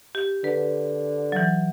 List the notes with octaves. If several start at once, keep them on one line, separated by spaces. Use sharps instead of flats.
G4
D3 B4
E3 F#3